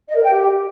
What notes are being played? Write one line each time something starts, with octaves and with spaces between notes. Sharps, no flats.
D#5
A#4
G5
G4